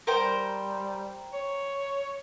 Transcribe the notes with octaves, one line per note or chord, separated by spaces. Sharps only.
G3 A#4 C5 G5
C#5